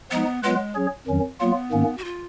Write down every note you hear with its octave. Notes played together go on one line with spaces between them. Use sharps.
F3 G#3 B3 D#4
F#3 G#3 B3 F4 B4
F#3 C#4 G#4 C#5
F2 D#3 F#3 C#4
F#3 A#3 B3 F4
G#2 D#3 A#3 C#4
F#4
F4